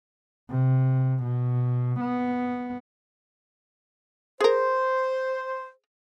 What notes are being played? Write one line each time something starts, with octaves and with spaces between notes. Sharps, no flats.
C3
B2
B3
G#4 A#4 C5